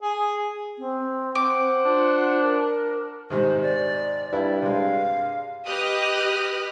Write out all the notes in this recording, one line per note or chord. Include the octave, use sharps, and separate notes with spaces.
G#4
C4
C5 F#5 D6
D4 F4
A#4
G#2 C3 D#3 C5
D5
G2 E4
C3 G#3 F5
G4 B4 D#5 D#6 F6 F#6